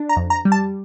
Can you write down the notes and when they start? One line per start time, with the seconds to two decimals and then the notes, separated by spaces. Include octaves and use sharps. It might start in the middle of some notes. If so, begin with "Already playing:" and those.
Already playing: D4
0.09 A#5
0.16 F2
0.30 A#5
0.45 G3
0.52 A5